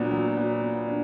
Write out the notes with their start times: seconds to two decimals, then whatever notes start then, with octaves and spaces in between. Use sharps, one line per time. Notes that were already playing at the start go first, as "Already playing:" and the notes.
Already playing: A#2 F#3 B3 D4
0.12 F#3
0.37 B3
0.62 B3
0.88 D4